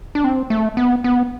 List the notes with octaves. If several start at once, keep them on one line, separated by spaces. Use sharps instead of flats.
D4
C4
A3
B3
B3